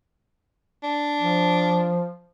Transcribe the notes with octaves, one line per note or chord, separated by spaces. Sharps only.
D4
F3